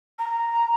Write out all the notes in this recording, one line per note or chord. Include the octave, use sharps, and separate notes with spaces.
A#5